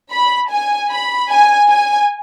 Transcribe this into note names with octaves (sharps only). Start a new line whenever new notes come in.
B5
G#5
B5
G#5
G#5